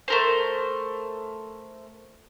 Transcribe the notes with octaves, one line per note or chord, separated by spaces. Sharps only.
A3 A#4 C5